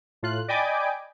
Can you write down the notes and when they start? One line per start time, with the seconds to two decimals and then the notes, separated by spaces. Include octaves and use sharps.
0.23 A2 F4 F#6
0.48 D5 D#5 G5 G#5 B5 D6